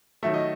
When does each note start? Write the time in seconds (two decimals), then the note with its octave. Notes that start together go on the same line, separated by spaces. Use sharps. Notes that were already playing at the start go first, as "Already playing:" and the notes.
0.23 D#3 F#3 A3 E5
0.34 D#5